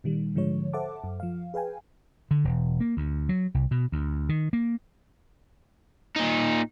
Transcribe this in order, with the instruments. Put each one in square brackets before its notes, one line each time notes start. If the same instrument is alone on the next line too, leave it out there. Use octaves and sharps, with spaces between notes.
[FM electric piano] A#2 D#3 G3
G#2 D3 F3 G#3 C#5
A4 C5 E5 F#5 A5 D6
F#2
F3 F5
G#4 B4 F5 G5 G#5
[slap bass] D3
E1
A#3
D2
F#3
C2
B2
D2
D#3
A#3
[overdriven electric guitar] A#2 D#4